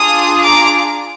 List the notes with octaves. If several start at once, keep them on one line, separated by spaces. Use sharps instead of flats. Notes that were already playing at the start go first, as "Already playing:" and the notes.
Already playing: D4 F4 G#4 D#6
A#5 D6